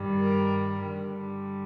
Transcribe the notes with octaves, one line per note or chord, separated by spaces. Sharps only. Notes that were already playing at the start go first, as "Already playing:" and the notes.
Already playing: G2 D#3 G3
A#4
G2 D3 G3